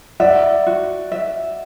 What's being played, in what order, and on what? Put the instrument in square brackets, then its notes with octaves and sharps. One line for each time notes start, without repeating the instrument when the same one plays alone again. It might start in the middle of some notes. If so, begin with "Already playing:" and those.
[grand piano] D5 F#5 [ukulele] E5
[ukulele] F#4
E5